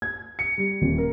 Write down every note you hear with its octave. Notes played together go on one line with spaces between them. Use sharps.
G#6
C#7
G3
D#1
A#4